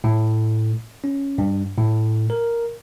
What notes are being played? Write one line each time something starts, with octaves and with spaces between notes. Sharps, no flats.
A2
C#4
G2
A2
A#4